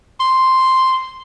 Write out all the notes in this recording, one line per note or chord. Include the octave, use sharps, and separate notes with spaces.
C6